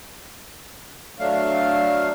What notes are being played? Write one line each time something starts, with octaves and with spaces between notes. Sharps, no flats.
F#3 A3 D4 F5